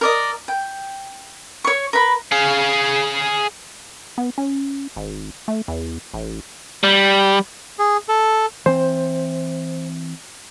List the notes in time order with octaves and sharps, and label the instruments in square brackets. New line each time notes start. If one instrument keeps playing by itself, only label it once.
[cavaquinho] A#4 D5 D#5
G5
C#5 C#6
A#4 B4 B5
[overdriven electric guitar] G#4 F5
[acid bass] B3
C#4
G#1
A3
E2
A1
[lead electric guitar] G3
[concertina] G#4
A4
[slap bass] E3 C4 [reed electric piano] C5